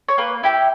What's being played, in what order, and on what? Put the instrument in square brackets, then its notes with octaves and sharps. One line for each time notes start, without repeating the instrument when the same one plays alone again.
[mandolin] C#5
A#3 B4
E4 G4